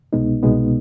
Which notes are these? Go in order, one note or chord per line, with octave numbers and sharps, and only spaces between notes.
C2 B2 G#3 B3 D#4
C2 B2 G#3 B3 D#4